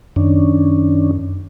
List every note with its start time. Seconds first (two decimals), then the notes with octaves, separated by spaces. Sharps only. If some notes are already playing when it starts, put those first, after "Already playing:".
0.16 F#2 D#3 C#4 D4